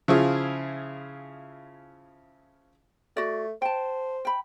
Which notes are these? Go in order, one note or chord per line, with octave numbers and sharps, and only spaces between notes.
C#3 F3 E4 F4 G#4
A3 F#4 D5
C5 G5 A5
G5 B5